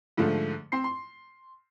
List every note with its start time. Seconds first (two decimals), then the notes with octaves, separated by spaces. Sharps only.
0.17 G#2 D3 F3 A3
0.72 C4 C6 C7
0.84 C6